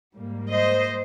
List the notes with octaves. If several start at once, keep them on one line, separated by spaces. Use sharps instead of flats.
G#2 G3 A#3
C5 D#5